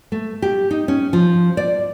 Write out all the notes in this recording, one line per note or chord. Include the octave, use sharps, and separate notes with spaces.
A3
G4
D#4
C#4
F3
D5